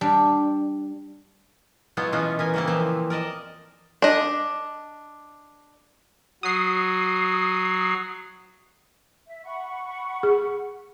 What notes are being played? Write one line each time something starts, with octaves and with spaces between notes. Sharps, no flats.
G3 D4
F#3 G#3 B3 E4 F4
B2 E3 G#3 B3 C#4 F4
E3 A#4 G#5
C#3 G3 A#3 C4 E4
E3 F3 C4
A#4 D5 D#5 A5
D4 D#5
F#3 D#6 C7
E5
F#5 B5 C#6
G#4